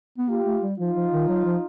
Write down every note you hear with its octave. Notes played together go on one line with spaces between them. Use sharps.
B3
A#3 F4 G4
A3
G3
F3 D#4 F4
F3
D#3
F#3
F3